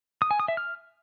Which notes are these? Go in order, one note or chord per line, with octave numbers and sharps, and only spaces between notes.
D#6
G#5
D#6
E5
F6